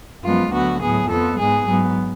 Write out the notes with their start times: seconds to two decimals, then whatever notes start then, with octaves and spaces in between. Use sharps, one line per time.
0.24 F#2 F3 G#3 B3 F4
0.53 D2 D3 F#3 B3 F#4
0.81 A2 F#3 B3 G#4
1.10 F2 F3 B3 A4
1.38 G#2 G#3 B3 G#4
1.67 G#2 F#3 B3